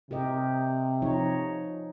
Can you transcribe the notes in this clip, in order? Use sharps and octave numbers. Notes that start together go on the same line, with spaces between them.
C3 G4 A#4 D#5
F3 D#4 C#5